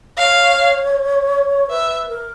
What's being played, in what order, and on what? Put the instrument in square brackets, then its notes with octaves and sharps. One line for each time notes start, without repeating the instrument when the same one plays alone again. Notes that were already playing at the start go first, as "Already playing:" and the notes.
[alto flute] C#5 [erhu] F5
[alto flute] B4 [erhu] E5
[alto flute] A#4